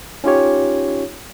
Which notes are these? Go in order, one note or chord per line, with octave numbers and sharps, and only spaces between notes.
C#4 D#4 F4 G4 C#5